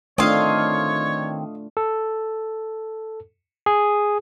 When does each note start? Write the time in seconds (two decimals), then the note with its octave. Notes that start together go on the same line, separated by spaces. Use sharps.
0.18 D#3 A3 C4 D4 F4 C#5 D#5 F5
1.77 A4
3.66 G#4